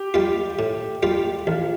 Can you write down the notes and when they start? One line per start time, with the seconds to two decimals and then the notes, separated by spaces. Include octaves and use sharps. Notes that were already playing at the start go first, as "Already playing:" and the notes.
Already playing: G4
0.14 G3 A#3 F4
0.59 A2
1.03 G3 A#3 F4
1.47 A1 F4